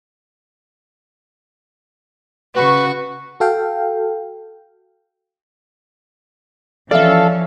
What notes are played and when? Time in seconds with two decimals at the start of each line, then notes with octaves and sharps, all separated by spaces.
2.54 C#3 F#4 B4 C#6
3.40 F#4 A4 F5 G5
6.91 E3 F3 C#4 A4 D5 E5 F5